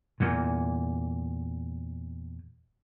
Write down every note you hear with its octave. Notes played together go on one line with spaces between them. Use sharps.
E2 A#2